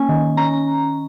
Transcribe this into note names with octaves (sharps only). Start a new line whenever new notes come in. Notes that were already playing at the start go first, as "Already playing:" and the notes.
Already playing: A#3 C#4 G#5
D#3
C#4 A#5